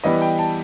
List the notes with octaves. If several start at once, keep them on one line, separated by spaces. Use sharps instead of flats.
E3 G3 B3 D#5
G5
A5